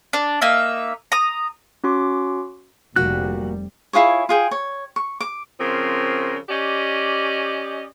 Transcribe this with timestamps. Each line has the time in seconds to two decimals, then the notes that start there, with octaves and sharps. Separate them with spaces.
0.13 D4
0.41 A#3 D#4 E5
1.12 A#5 D#6
1.84 C#4 F#4 C6 D6
2.96 F1 A#2 G3 A#3 F#4 F#6
3.93 E4 F4 G#4 C#5
4.29 F4 G#4 G5
4.51 C#5
4.96 C#6
5.21 D6
5.59 C#3 F3 C4 A#4
6.49 C#4 G4 D5 D#5